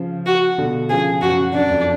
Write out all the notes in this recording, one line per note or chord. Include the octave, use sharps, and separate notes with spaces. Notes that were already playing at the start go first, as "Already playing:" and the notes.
Already playing: C#3 F3
F#4
B2 D3
C#3 F3 G#4
F#2 F#4
F#2 D4
F2